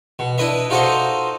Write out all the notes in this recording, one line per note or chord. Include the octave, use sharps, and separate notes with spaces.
B2
D4 E4 B4 D#5 E5
D#4 F4 F#4 A4 C5 D#5